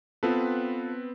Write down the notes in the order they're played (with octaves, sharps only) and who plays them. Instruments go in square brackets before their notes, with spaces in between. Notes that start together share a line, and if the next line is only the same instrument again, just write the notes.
[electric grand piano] B3 C4 B4 [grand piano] F4 A4